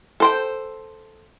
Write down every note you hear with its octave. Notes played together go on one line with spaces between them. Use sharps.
A4 C5 G5